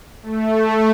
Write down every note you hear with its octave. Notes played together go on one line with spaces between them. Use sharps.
A3